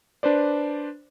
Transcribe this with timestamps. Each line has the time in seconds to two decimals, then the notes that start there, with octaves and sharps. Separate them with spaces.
0.23 D4 B4 C5 D5